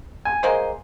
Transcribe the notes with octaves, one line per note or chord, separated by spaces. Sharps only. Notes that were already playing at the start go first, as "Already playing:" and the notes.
G#5
G#3 A#3 C5